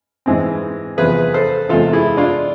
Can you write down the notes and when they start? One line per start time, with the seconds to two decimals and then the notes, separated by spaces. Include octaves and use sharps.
0.26 G#2 E3 G#3 C4
0.97 E2 C3 F3 G#4 B4
1.34 A4 C5
1.69 E2 C3 G#3 F4 A4
1.93 E4 G#4
2.17 D4 F4